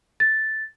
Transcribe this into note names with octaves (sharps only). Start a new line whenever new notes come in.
A6